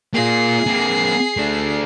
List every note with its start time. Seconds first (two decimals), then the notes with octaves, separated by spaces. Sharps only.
0.14 A#3 F4 G#4 C7
0.67 A#3 C4
1.37 A3 D4